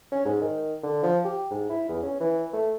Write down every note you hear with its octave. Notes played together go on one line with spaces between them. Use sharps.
C#4
G#2
D#3
D3
F3
G4
G#2
E4
E2
C#4
E3
A3